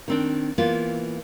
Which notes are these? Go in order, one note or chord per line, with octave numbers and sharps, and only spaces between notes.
D#3 C4 D4
E3 A#3 B3 F4